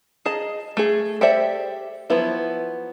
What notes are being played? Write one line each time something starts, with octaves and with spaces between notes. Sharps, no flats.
G#4 D#5 A5 A#5
A3 G#4
G4 A4 C5 D5 E5
F3 F#3 B3 E4